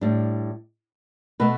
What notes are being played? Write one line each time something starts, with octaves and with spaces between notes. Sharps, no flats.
A2 G3 D4
B2 A3 B4